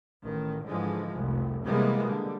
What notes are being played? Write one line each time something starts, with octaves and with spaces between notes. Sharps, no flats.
A1 D#3
G#2 D3 E3 F3 G#3
F1 C2
C3 E3 G3 G#3 A#3 B3
D3 G3